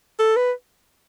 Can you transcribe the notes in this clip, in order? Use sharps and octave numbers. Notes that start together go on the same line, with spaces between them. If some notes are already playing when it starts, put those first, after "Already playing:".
A4
B4